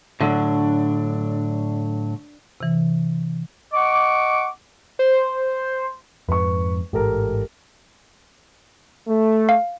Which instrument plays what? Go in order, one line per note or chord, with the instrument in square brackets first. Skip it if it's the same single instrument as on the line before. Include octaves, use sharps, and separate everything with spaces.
[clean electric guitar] A2 D3 F#3 [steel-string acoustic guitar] D4
[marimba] C3 E3
[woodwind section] D#5 F#5 C#6 D6
[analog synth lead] C5
[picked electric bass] F2 G#2 [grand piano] B4 C#6
[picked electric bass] A1 G#2 [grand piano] G4 A4 A#4
[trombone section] A3
[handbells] F5